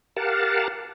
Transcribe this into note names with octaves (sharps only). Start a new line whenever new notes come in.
G4 A#4 F5 F#5 A5